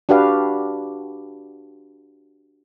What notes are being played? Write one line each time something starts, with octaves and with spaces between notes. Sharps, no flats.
D4 F#4 G4 B4 F5